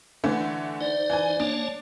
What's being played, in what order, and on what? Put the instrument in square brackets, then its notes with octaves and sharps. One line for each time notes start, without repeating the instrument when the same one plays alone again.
[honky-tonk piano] D3 E3 A3
[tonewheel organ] D#4 C5 [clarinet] D5
[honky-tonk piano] E3 G#5
[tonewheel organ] A#3 C#5 A5 [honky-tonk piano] D4